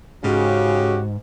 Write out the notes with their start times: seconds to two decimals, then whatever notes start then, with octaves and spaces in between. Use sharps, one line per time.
0.24 G#2 C#3 F#4 G4